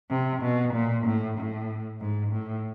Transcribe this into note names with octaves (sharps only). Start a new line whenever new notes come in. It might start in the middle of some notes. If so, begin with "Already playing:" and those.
C3
B2
A#2
A2
A2
G#2
A2